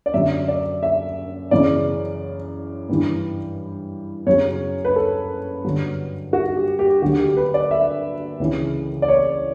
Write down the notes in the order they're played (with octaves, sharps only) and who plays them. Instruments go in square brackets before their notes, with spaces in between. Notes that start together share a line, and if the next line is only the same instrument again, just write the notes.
[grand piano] D5
F#2 D3 F#3 E5
D5
E5
F#2 C#3 E3 D5
G2 E3
F#2 C#3 F#3 C#5
B4
A4
G2 D3 F#3
F#4
G4
G4
D2 D3 F#3 F#4
G4
B4
D5
E5
C#2 C#3 E3
D5
C#5